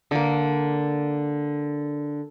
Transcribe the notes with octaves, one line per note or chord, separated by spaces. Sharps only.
D3 A#3